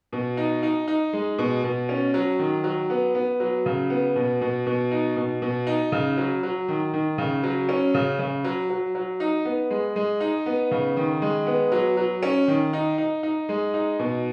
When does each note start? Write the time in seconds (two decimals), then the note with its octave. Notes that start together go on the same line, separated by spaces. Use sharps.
0.13 B2
0.37 D#4
0.63 D#4
0.88 D#4
1.13 G#3
1.38 B2
1.64 B2
1.89 C#4
2.14 F#3
2.39 D#3
2.64 F#3
2.90 B3
3.15 B3
3.40 F#3
3.66 C#3
3.90 B3
4.16 B2
4.41 B2
4.66 B2
4.91 D#4
5.16 B2
5.42 B2
5.67 D#4
5.92 C#3
6.17 F#3
6.43 F#3
6.68 D#3
6.93 D#3
7.18 C#3
7.43 F#3
7.69 C#4
7.94 C#3
8.19 C#3
8.44 F#3
8.70 F#3
8.95 F#3
9.20 D#4
9.45 B3
9.70 G#3
9.96 G#3
10.20 D#4
10.46 B3
10.71 C#3
10.97 D#3
11.22 G#3
11.47 B3
11.72 F#3
11.97 F#3
12.23 C#4
12.48 D#3
12.73 D#4
12.98 D#4
13.23 D#4
13.49 G#3
13.74 D#4
13.99 B2